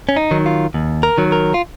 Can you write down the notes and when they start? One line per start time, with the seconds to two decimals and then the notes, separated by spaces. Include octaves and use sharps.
0.09 C#4
0.16 D#4
0.31 D#3 F#3
0.46 F4
0.74 D#2
1.03 A#4
1.18 D#3 F#3
1.32 A#4
1.54 F4